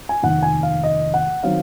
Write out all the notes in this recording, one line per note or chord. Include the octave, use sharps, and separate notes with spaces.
G#5
F1 D#2 D#3 F#5
G#5
F5
D#5
F#5
D#3 F#3 C4 F5